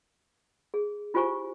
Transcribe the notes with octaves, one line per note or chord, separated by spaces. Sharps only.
G#4
E4 F4 G4 C5 G#5 C#6